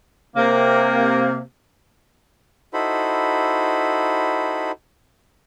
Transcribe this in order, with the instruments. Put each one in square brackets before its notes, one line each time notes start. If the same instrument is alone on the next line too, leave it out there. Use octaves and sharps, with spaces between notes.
[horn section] C3 A#3
[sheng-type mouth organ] D#4 E4 F#4 A4 C5 B5